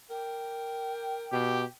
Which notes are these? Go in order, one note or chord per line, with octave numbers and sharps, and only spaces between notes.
A#4 G5
B2 G4